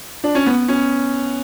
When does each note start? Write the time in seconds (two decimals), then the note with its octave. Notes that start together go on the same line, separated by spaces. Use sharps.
0.24 D4
0.35 C#4
0.46 B3
0.68 C#4